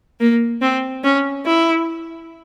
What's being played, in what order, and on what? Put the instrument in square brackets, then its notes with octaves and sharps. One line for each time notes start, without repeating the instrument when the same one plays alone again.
[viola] A#3
C4
C#4
E4